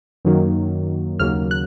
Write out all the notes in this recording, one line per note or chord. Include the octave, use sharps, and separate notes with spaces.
F#2 D#3 F#3 A#3
D#2 C#3 F#3 A#3 F6
F#6